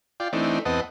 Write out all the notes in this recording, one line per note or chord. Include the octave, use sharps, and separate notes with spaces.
F4 D5 G5
E3 A3 C4 D4 D#4
E2 B3 C4 D#5 F#5 A5